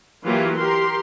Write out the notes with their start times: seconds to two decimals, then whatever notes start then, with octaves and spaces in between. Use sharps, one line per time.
0.24 E3 F#3 A#3 F4 G4
0.57 G4 A#4 C6